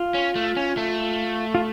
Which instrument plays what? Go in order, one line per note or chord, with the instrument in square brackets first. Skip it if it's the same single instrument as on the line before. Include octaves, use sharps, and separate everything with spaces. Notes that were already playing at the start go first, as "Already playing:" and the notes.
Already playing: [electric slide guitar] F4
[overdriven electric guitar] C#4
A3
C#4
A3
[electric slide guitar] F4